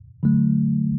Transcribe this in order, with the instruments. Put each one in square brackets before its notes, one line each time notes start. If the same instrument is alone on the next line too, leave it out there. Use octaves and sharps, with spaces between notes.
[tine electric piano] D3 F#3 A3